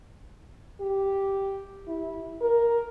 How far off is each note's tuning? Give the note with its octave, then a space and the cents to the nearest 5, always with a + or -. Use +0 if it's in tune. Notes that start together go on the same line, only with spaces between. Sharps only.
G4 -5
E4 -15
A#4 +5